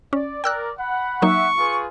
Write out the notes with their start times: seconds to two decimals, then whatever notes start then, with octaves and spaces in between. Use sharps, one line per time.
0.13 C#4 D5
0.44 A#4 D5 G5 E6 F#6
0.78 F#5 B5
1.22 F#3 A#3 D#4 E5 F#5 C#6
1.57 F4 G#4 B4